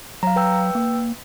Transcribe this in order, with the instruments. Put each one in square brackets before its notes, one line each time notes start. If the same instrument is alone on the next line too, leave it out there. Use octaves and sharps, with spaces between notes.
[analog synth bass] F#3 [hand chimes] F5 A#5
[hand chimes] B4 G5 E6
[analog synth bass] A#3